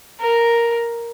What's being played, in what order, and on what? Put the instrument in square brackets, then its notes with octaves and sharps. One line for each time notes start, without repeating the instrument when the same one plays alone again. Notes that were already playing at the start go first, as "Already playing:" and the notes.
[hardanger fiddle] A#4